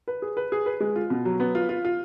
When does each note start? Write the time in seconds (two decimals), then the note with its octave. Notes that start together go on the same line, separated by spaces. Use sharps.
0.08 B4
0.22 G#4
0.37 B4
0.52 G#4
0.66 B4
0.80 G#3
0.96 F4
1.10 B2
1.25 F#3
1.40 B3
1.55 F4
1.69 F4
1.85 F4